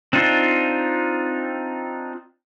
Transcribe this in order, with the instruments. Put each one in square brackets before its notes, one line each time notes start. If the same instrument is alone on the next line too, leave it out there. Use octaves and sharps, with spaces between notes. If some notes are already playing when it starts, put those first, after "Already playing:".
[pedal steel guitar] C4 D4 D#4 F4